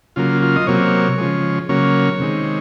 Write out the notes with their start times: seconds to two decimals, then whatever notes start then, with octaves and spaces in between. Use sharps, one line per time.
0.16 C#3 F#3 A#3 F4
0.42 F4
0.56 D#5
0.67 C3 F#3 A#3 C#5
1.18 C#3 F3 G#3
1.69 C#3 F#3 A#3 C#5
2.20 C3 D#3 G#3